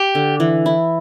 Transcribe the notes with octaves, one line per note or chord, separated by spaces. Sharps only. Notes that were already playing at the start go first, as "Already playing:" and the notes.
Already playing: G4
D3
E3
E4